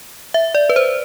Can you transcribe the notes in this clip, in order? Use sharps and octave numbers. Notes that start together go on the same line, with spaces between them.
E5
D5
B4
C5